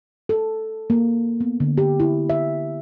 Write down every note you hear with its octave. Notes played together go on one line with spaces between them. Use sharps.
A4
A#3
B3
D3
G4
E4
E5